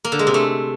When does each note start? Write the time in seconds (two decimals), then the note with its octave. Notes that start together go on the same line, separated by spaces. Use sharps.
0.04 A#3
0.12 D3
0.19 G#3
0.27 C3
0.34 A3